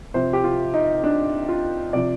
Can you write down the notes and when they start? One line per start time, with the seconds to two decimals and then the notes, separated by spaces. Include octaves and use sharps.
0.14 C3 F3 C5
0.33 G4
0.44 F4
0.74 D#4
1.04 D4
1.49 F4
1.93 C3 F3 D5